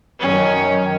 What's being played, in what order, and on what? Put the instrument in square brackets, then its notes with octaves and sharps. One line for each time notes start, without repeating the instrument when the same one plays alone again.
[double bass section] F#2 D#3 [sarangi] C#4